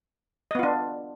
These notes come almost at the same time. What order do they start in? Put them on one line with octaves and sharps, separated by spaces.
D#5 B3 F4 D4